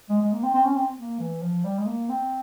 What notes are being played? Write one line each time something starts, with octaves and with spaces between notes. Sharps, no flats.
G#3
G#3
A#3
C4
C4
C#4
C4
A#3
E3
F3
G3
G#3
A#3
C4